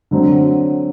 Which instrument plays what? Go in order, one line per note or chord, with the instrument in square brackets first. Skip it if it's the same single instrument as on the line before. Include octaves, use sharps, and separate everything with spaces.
[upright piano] D3 F#3 A3 C4